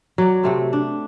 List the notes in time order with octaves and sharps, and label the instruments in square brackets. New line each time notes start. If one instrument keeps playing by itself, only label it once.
[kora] F#3 D5
C3 A3 C4
D4